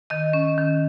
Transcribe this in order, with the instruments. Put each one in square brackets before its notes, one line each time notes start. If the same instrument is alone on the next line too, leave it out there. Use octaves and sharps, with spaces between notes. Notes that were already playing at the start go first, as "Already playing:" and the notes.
[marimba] D#3 D#5
C#4
D#3